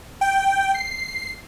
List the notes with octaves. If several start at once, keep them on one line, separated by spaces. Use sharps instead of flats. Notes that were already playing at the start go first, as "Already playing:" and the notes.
G5
C7